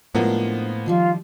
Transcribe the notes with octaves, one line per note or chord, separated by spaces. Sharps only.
A2 F3 G#3 A#3 B3 D4
D#3 F3 G3 F4